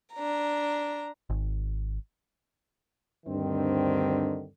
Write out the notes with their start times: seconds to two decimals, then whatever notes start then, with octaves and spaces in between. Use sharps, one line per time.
0.14 D4 A#5
1.30 G#1
3.26 D2 G2 D3 D#3 C4